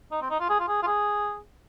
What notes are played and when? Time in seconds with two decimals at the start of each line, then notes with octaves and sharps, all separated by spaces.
0.12 D#4
0.22 C4
0.31 D#4
0.40 F4
0.49 G#4
0.60 F4
0.68 G#4
0.83 F4
0.87 G#4